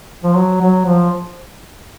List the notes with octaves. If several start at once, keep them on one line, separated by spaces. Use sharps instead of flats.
F3
F#3
F#3
F3